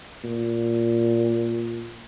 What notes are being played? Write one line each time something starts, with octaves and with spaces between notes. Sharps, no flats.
A#2